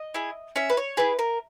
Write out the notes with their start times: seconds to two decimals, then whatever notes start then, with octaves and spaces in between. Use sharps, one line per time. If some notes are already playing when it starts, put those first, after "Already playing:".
Already playing: D#5
0.14 E4 G#4
0.56 C#4 E5
0.70 B4
0.77 C#5
0.97 E4 G#4 B4
1.19 A#4